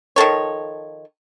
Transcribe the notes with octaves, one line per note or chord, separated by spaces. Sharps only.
D#3 F3 A4 C#5